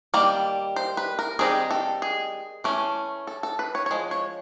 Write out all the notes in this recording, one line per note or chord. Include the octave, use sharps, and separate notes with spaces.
D#3 G3 A#3 D5
C5
B4
A#4
D#3 G3 C4 D#4 G#4
A4
G#4
E3 A3 C#4
A4
A4
B4
C#5
C#5
F3 G#3
C#5